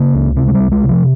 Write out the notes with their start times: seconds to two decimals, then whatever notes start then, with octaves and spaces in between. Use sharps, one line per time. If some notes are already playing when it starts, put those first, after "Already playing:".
Already playing: C#3 A#3
0.14 C#2
0.36 C3 C4
0.48 G#3
0.55 C2 G3
0.72 G#3
0.83 C3
0.89 F3